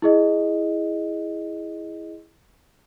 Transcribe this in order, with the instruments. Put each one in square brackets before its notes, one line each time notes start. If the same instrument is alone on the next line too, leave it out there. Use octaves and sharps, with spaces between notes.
[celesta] E4 G#4 D#5